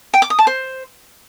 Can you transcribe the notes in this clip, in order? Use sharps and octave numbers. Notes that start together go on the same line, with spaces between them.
G5
D6
D#6
A5
C5